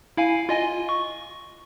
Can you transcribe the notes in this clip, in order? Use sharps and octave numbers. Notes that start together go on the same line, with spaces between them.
E4 F5 G#5
F4 D#5 G#5
C#6